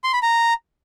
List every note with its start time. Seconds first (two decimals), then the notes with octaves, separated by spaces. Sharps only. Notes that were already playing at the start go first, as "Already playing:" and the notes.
0.04 C6
0.13 B5
0.22 A#5